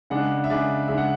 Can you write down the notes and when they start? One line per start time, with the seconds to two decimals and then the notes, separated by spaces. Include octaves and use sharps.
0.10 C#3 G#3 D4 F#5
0.44 E5
0.50 C#3 G#3 D4 D5
0.88 C#3 G#3 D4 E5
0.98 F#5